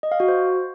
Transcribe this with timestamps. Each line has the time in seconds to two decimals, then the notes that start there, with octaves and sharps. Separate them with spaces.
0.03 D#5
0.12 F5
0.20 F#4
0.28 C5